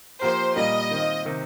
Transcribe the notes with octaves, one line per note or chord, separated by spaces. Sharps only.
F3 A#3 G4 A#4 C5
A#2 G3 A#3 F4 D#5
D#3 C4 F4
C3 D#3 C4 D#4